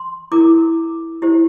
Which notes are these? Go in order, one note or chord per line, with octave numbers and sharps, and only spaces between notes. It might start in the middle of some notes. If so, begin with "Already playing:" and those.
Already playing: C6
E4 A#4 D6
E4 G4 C5